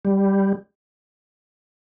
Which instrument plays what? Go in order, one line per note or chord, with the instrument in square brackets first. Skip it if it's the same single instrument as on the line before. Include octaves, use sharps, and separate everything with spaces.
[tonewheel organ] G3